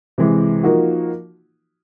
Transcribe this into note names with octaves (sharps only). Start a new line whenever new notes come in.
C3 E3 G#3
F3 A#3 D#4 F#4